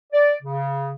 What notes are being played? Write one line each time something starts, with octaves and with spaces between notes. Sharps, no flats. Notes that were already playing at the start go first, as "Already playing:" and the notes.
D5
C#3